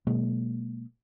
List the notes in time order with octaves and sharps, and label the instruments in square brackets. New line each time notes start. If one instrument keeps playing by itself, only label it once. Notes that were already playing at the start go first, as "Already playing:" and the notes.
[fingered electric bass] B2 F#3 G#3 A#3